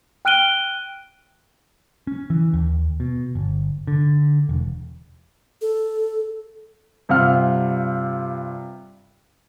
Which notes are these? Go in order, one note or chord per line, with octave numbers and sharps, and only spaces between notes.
G5 F6 F#6 D7 D#7 G7
C#4
E3
D#2
B2
G1
D3
E1
A4
G2 C3 F4 F#5 F6